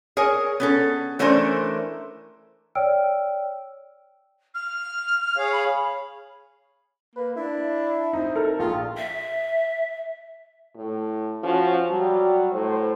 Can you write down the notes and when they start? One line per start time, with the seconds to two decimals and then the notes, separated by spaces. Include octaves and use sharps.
0.17 G#4 A#4 C#5 G#5
0.60 B3 C#4 A4
1.19 E3 A3 C#4 D4 A#4 C5
2.75 C#5 D5 G5 E6 F6 D7
4.54 F6
5.37 G#4 C#5 F5
5.52 B5
7.16 A#3 B4
7.37 D4 E4
8.13 C4 D#4
8.35 A4 A#4
8.59 A#1 F4
8.97 E5
10.76 A2
11.44 F3 C#4 F#4
11.92 F#3 G3
12.53 A2 C5